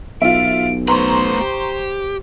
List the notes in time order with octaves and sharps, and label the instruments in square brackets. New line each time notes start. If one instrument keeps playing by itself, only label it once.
[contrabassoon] B1 [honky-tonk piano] F4 E5 [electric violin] D7
[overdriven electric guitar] A3 B4 [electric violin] C5 [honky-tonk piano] A#5 C6 C#6
[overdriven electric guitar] G4